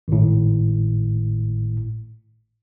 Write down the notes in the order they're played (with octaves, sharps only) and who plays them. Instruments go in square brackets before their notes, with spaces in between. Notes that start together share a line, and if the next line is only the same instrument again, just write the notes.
[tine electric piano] G#1 A2